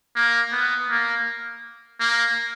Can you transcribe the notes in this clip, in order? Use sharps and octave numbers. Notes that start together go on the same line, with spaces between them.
A#3
B3
A#3
A#3